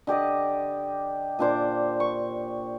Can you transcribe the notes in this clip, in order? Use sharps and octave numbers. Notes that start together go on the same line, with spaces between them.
D3 G4 D5 D#5
A#2 D4 C5 D6
C#6